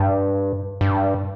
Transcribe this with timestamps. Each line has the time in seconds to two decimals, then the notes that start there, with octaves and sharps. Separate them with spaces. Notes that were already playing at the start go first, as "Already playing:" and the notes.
Already playing: G2
0.81 G2